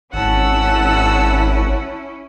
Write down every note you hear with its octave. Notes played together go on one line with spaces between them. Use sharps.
G#1 C#4 E4 F#5 A5 E6